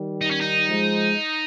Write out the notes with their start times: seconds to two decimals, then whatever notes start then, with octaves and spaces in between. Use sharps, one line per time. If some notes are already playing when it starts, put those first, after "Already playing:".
Already playing: D#3 G3
0.21 D#4
0.30 C#4
0.41 D#4
0.69 F3 G#3